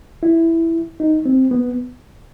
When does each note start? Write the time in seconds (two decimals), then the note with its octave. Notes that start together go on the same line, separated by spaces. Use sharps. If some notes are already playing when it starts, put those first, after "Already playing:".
0.23 E4
1.00 D#4
1.26 C4
1.51 B3